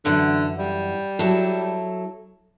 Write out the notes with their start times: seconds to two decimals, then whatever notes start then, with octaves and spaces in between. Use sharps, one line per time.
0.05 F#2 D3 E3 F#5
0.59 G3
1.19 F#3 E4 A4